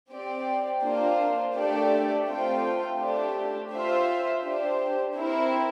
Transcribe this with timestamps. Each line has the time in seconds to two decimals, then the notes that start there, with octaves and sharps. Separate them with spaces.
0.10 C4 G4 D5
0.82 A#3 D4 F4 C5
1.55 A3 D4 G4 D5
2.27 A3 C4 F4 C5 G5
2.99 A3 D4 G4
3.71 F4 C5 E5
4.43 D4 G4 C5
5.15 C4 E4 A#4